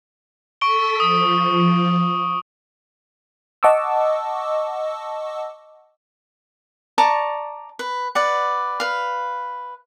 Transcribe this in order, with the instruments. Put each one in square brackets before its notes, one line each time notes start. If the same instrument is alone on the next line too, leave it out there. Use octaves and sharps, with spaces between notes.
[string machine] A4 B6 [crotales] C#6 D7 G7
[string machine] F3 [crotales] D#6
[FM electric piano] D#5 F#5 A5 C#6 D6 E6
[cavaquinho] D5 A5 A#5 C#6
B4
B4 D5 F#5
B4 F5